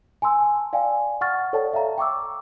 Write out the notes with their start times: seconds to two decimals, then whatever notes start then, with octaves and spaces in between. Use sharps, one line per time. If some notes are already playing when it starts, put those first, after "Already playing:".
0.22 G#5 A5 C6 E6
0.73 D5 F5 G5 G#5
1.21 F#5 C#6 F6 A6
1.53 A4 C#5 D5 F#5 G5 A5
1.74 E5 F5 G5 A#5
1.98 G5 C#6 D6 E6